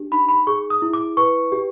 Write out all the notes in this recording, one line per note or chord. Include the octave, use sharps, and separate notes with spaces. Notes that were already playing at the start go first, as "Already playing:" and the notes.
Already playing: D4 G4
D#4 B5
B5
G#4 C#6
D#6
E4
D6
B4 C#6
G4